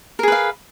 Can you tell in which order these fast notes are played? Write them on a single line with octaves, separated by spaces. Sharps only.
A#4 G#4 B4 F5